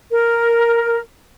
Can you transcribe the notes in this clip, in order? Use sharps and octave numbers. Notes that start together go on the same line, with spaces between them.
A#4